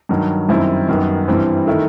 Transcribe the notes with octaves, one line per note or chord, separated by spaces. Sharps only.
G2 D#3 F#3
F#2 D#3 G3 C4 E4
F#2 D#3 G3 B3
G2 E3 G3 C4
D#3 A3 E4